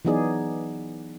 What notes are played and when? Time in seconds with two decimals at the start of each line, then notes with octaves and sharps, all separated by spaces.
0.05 E3 F#3 B3 D#4 G#4 D5